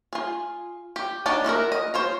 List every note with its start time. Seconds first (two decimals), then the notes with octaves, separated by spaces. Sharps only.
0.13 F4 G#4
0.96 G4
1.26 D4 D#4 C#5 D5 A5
1.44 A#3 E4 F#4 A#4
1.72 D#5
1.94 C5 C#5 F5